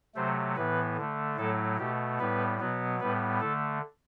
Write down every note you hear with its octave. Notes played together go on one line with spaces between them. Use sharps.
C3 F#3 A3 C5
A2 E3 B3 B4
D3 A3
A2 F#3 A3 A4
B2 A3 G4
A2 G3 B3 B4
B2 F#3 B3
A2 G3 B3 B4
D3 A3 A4